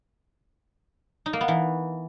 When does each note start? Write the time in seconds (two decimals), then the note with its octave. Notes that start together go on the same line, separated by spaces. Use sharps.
1.26 D#4
1.33 A#3
1.41 B3
1.48 E3